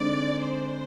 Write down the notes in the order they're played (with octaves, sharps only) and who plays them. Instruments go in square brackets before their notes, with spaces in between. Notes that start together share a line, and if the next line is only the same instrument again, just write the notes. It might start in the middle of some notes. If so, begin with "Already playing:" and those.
Already playing: [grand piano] D3 G#3 C4 D#4 [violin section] D5
[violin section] C5